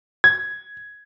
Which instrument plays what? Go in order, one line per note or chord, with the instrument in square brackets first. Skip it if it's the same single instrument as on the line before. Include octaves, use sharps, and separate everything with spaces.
[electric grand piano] G#6